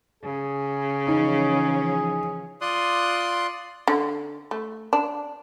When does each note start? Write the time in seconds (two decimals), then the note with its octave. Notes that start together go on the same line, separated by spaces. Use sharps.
0.23 C#3 G#4
1.07 E3 F3 C#4 D#4
2.61 F4 D5 C6 D#6 F#6
3.88 D3
4.51 A3
4.93 D4